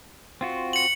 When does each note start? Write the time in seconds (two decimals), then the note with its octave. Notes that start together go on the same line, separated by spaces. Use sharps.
0.41 C4 F4 F#4
0.73 C#7 F#7